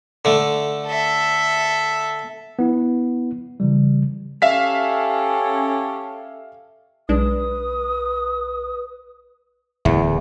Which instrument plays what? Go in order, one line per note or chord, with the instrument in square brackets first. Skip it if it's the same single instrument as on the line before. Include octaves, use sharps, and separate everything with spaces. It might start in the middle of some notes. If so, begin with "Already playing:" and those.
[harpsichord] D3 A3
[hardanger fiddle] A4 E5
[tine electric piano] B3 E4
C#3 E3 G3
[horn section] C#4 G4 A4 [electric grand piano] E5 F5 B6
[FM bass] B1 [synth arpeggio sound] G#3 D4 [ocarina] B4 [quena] D#6
[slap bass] D1 [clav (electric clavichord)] E2